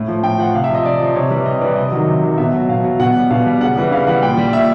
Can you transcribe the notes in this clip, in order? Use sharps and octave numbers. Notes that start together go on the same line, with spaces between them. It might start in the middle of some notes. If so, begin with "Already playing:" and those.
Already playing: A2
F3
A2 G5
F3 F#5
C3 F5
E5
F3 D#5
C3 D5
F3
C3 C#5
E3 G3
C3 D#5
E3 G3 D5
C3 D#5
D#3 F#3
C3
D#3 F#3
B2 E5
F#3
B2 F5
F#3
B2 F#5
G3
B2 F5
G3
C#3 F#5
E3 G3
C#3 F5
E3 G3 F#5
A#2 G5
G3
A#2 E5